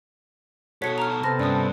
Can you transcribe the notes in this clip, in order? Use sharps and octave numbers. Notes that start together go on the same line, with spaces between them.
B2 F#4 A4 C#5 B6 C#7
A#5 F6
A5
C3 B3 A4 F6 A#6
G2 C#4 D5 D#6